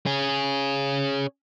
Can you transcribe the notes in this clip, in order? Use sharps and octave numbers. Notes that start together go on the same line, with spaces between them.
C#4 G#4